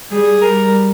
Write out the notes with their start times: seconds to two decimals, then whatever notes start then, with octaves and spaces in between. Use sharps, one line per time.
0.11 G3 G#4
0.42 G3 A#4